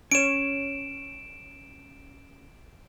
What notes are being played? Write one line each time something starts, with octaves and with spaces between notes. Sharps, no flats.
C#4 C#5 D7 E7